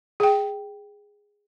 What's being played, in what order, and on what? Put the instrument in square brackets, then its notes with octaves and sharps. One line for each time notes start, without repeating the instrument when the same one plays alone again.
[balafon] G#4 G5